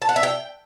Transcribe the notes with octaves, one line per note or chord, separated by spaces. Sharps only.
A5
F#5
E5
G5